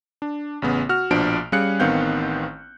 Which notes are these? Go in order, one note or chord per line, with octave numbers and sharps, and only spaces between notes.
D4
A1 C#3 B3
F#4 F6
A#1 B2 F3 D4 D7
G3 C#4 G#4 F5 F#6 C#7
A1 D#3 B3 C4 F5 G6